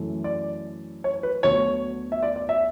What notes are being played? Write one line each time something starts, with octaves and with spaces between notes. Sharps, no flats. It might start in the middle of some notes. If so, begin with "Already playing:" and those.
Already playing: F#2 E3 A3
D5
C#5
B4
D2 D3 F#3 B3 C#5
E5
D5
D5
E5